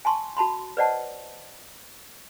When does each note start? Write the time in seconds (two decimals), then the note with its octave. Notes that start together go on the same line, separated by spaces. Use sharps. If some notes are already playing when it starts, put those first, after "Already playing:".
0.05 G#5 A5 C6 C#6
0.37 F#4 A5 B5 C6
0.77 B4 C5 D5 D#5 F#5 A5